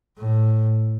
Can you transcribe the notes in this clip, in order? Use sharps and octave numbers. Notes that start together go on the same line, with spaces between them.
A2